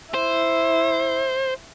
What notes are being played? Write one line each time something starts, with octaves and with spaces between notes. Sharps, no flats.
E4 C5